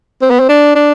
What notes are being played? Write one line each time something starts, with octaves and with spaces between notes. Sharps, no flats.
C4
B3
C4
D4
D4